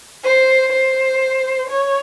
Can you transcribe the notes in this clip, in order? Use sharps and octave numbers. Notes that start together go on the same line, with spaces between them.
C5
C5
C#5